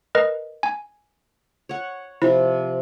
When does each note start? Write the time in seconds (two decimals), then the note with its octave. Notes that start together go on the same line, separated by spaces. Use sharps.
0.15 A#4 B4 D#5
0.63 G#5
1.69 C#5 F#5
2.22 C3 F3 E4